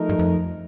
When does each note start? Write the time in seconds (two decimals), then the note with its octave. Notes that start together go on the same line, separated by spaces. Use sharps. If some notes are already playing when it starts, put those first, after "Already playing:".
Already playing: F3 A3 D#4 A#4
0.09 G2
0.19 F2